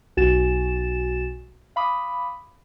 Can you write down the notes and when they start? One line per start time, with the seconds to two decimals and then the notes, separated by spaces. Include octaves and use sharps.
0.17 B1 F#4 G#5 A6 E7
1.76 F5 B5 D6 D#6